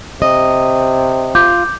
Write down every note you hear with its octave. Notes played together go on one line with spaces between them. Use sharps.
C3 D#5
F4 D6 G6